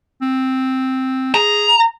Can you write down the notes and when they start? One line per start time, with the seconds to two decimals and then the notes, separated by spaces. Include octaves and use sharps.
0.22 C4
1.34 G#4 A#5